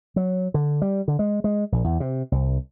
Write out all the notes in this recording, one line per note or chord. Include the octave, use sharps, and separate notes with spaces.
F#3
D3
G3
D3
G#3
G#3
A#1
E2
C3
C2